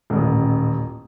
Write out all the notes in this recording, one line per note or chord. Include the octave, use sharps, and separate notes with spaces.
D#1 A1